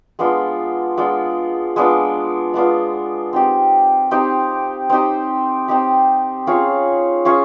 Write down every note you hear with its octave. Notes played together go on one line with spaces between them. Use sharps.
G#3 B3 D4 F4
G#3 B3 D4 F4
G#3 B3 D4 F4
G#3 B3 D4 F4
C4 D#4 G4
C4 D#4 G4
C4 D#4 G4
C4 D#4 G4
C#4 F4 G#4 C#5
C#4 F4 G#4 C#5